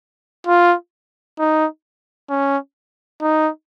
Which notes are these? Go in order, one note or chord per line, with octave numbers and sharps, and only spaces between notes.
F4
D#4
C#4
D#4